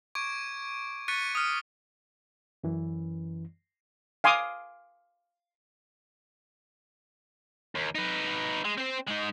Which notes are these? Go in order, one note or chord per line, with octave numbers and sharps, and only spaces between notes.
C#6 D6 G#6 D7
C#6 F#6 A6 B6 C#7 D#7
D#6 F6 D#7
F#2 E3
F5 G#5 C6 D6 D#6
D#2
D#4 B4
G#3
C4 C5
G#3 D#4